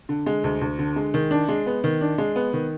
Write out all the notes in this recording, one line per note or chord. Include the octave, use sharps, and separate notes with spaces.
D3
G#3
D2
D2
D3
G#3
D#3
D4
G#3
B3
D#3
D4
G#3
B3
D#3